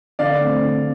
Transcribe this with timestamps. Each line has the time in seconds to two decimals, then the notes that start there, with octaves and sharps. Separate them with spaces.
0.19 D3 D5 F5
0.41 A3 C4
0.63 D3